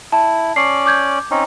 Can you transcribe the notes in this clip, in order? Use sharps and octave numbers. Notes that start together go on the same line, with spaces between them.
E4 A5
C#4 D5 C7
D6 G6 G#6
C4 C#4 D#4